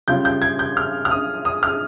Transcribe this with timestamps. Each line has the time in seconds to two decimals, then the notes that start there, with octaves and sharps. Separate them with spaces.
0.08 C#3 G3 C#4 F4 G6
0.25 G6
0.42 G#6
0.59 G6
0.77 F6
1.05 F6
1.11 D#6
1.45 D#6
1.63 F6